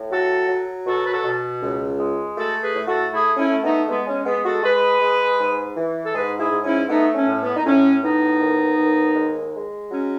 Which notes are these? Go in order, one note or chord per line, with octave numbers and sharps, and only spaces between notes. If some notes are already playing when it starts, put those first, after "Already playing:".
Already playing: A2
F#3 F#4 A4
F#3
B2 F#4 A4
B4
F#4 A4
B2
C#2
G#3
A3 F#4 A4
G#4 B4
A2
F#4 A4
A3 E4 G#4
C#4 E4
A3
B3 D#4
G#3 B3
C#4
G#3 B3
F#4 A4
G#3 G#4 B4
G#3
G#2
E3
A4
G#2 G#4 B4
E4 G#4
G#2
C#4 E4
A3 B3 D#4
C#4
A2
B3
D#4
A2 C#4
A2 B3 D#4
D#2
D#2
G#3
G#3
F#3 C#4